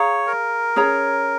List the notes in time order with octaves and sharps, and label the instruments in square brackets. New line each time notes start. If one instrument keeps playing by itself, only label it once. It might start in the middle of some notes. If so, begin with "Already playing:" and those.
Already playing: [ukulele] G#4 F5 A#5 [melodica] C#5
[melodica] A#4
[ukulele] C#4 G#4 C#5 A#5